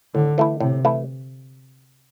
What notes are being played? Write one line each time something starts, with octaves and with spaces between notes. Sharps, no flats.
A2 D3
E3 A3 E4
A2 C3
E3 A3 E4